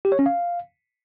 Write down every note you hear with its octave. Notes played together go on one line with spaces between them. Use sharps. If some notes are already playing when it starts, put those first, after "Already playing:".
G4
C#5
C#4
F5